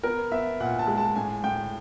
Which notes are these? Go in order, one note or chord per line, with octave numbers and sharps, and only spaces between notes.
B3 A#4
B3 E5
A#2 F#5
A5
G#3
A5
A2 G#5
A2 G5